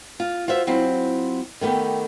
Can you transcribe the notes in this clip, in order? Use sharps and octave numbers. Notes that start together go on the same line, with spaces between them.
F4
F4 F#4 C5 E5
F#3 C4 E4 F4
D#3 A3 B3 G4